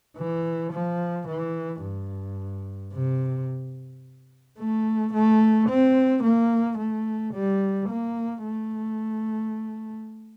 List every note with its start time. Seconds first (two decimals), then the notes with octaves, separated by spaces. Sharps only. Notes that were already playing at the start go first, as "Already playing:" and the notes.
0.17 E3
0.73 F3
1.28 E3
1.82 G2
2.93 C3
4.58 A3
5.13 A3
5.69 C4
6.23 A#3
6.78 A3
7.33 G3
7.89 A#3
8.44 A3